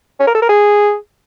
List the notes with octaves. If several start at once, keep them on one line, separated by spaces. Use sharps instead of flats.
C#4
A#4
A4
A#4
G#4